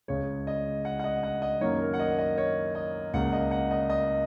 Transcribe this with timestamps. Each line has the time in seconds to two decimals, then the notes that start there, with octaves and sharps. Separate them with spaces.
0.08 C#2 C#3 G#3 C#5
0.47 D#5
0.85 F#5
0.99 F#5
1.04 D#5
1.23 F#5
1.42 D#5
1.61 F#2 D#3 A#3 C#5
1.80 A#4
1.93 F#5
1.99 D#5
2.18 D#5
2.38 C#5
2.75 D#5
3.13 C#2 C#3 A#3 F#5
3.33 D#5
3.51 F#5
3.71 D#5
3.90 D#5